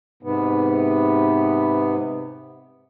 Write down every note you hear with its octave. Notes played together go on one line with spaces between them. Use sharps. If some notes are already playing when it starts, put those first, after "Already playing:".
G#2 C3 B3